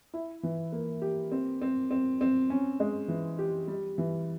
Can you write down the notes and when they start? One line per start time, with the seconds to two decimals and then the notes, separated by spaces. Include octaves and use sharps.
0.14 E4
0.43 E3
0.72 A#3
1.02 G4
1.32 C4
1.62 C4
1.91 C4
2.21 C4
2.50 C#4
2.80 G#3
3.08 E3
3.39 G4
3.68 G3
3.98 E3